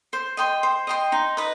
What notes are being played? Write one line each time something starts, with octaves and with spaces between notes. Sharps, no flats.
C5
D#5 G5 C6
C5
D#5 G5 C6
D#4
B4 D#5